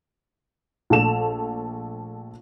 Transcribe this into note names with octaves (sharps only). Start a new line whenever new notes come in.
A#1 A3 A4 E7 F7